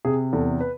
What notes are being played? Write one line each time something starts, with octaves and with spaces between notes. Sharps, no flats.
C3 G#4
E2 A4
B4